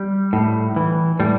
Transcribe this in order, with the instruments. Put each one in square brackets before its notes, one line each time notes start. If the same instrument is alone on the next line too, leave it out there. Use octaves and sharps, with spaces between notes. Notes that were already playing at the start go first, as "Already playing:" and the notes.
Already playing: [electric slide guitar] G3
A2
E3
A2 G3